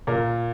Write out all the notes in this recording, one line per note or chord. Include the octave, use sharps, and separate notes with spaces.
A#2 A#4